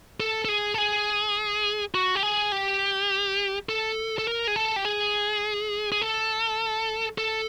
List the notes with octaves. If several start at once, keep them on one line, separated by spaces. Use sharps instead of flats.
A4
A4
G#4
A4
G#4
F#4
G4
G#4
G4
A4
A4
A#4
G#4
A4
G4
G#4
G#4
A4
A4